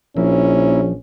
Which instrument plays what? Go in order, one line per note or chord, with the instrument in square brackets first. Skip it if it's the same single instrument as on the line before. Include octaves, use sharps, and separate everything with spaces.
[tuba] A#1 [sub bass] F3 [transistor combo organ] A#3 E4 [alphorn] C#4